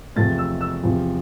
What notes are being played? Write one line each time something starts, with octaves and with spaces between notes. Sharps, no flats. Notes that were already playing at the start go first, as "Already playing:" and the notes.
E2 C3 F3 A3 A6
E6
E6
E2 C3 F3